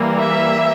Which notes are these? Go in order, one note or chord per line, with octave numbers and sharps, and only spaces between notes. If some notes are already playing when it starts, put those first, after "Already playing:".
Already playing: E3 G3 A#3
E5